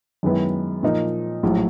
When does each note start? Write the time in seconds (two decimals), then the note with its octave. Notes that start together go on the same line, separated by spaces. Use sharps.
0.23 F#2 D#3 G#3 B3 E4
0.83 A#2 F3 A#3 D#4
1.43 A#1 A2 F#3